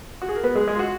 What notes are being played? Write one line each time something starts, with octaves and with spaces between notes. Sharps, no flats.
F#4
G#4
A#4
B3 B4
G#3 G#4
G#3 G#4
F4
F#4